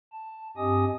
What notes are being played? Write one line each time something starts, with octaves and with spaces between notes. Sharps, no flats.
A5
G2 C4 G4 D#5 G#5 D#6